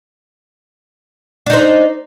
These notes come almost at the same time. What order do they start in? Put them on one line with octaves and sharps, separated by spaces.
D4 D#4 C5